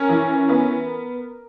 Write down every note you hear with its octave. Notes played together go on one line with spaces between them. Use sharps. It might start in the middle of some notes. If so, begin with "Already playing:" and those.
Already playing: C#4 A#4
E3
B3